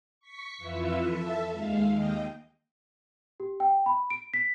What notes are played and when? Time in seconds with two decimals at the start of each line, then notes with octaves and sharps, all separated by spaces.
0.20 C#6 B6 C#7
0.58 F2 E3 F4 B4 E5
1.00 A4 E5
1.51 D#2 G#3 F5
1.88 D#2 D#5 G5
3.40 G4
3.60 G5
3.86 B5
4.10 D7
4.34 B6